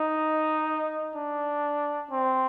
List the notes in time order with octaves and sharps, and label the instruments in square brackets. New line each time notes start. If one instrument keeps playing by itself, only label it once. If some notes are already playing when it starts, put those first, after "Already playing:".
Already playing: [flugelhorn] D#4
D4
C4